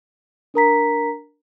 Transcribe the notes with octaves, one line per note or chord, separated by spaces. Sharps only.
D4 A#4 A#5 B6